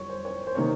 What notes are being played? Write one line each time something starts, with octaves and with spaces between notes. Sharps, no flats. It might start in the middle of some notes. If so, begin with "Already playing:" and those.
Already playing: F2 G3 C#5
C5
C#5
C5
C3 D#3 A#3 C#5